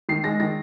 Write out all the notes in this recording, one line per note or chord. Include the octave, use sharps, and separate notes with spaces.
D#3 C7
G#3 A#6
D#3 A#6